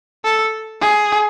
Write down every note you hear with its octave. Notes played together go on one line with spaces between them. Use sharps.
A4
G#4